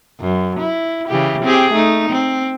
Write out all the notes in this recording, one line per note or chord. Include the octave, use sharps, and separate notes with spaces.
F#2
E4
C#3 E3 G4
C4 G4 G#4
A3 D#4
C4